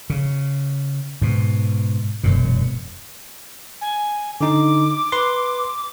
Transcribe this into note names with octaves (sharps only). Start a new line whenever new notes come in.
C#3
G#2 B2
E1 F#2 A#2
G#5
D3 D#4 D6
B4 C6